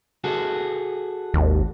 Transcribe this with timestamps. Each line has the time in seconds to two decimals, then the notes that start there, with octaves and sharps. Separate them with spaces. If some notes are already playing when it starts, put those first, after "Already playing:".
0.24 F#4 G#4 A4
1.34 G#1 D#2